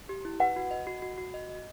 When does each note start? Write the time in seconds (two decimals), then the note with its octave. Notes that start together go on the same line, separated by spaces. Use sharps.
0.09 G4
0.25 E4
0.40 B4 F#5
0.56 F#4
0.71 D#5
0.87 F#4
1.02 F#4
1.18 F#4
1.34 D#5
1.49 D#5